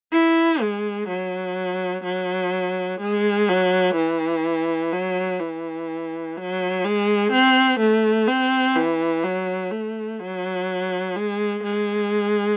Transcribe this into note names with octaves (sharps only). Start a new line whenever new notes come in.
E4
G#3
F#3
F#3
G#3
F#3
E3
F#3
E3
F#3
G#3
C4
A3
C4
E3
F#3
A3
F#3
G#3
G#3